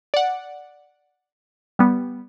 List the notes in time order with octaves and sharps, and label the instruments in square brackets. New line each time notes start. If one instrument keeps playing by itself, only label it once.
[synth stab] D5 F#5
G3 B3